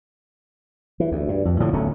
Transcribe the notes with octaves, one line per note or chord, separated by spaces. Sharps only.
E3
D2
G2
F2
A2 D3 F3
D1 B1 A3 C#4